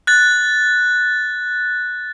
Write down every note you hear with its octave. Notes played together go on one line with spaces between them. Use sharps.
F#6 A6